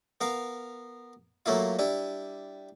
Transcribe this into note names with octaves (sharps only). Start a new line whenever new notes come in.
B3 A#4 F5
F#3 A3 A#3 E4 F4
G3 D4 E4